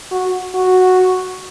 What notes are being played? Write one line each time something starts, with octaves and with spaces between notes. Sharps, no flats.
F#4
F#4